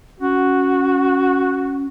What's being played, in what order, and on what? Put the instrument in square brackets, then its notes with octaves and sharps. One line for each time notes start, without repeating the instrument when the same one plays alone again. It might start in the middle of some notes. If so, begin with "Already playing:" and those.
[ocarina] C#4 [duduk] F#4